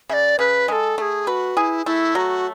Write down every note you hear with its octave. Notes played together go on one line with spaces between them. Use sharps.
C#3 D5 E5
C#3 B4
G#3 A4 B4
A3 G#4 A4
F#4 B4
E4 G#4
A3 E4
F#3 F#4